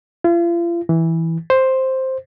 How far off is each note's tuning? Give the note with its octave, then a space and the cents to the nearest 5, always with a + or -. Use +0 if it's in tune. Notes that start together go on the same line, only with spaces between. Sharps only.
F4 -40
E3 -10
C5 +5